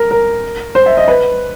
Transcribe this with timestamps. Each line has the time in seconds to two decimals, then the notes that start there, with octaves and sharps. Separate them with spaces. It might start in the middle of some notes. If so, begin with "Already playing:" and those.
Already playing: A#4
0.11 A#4
0.75 C5
0.86 E5
0.97 D#5
1.08 B4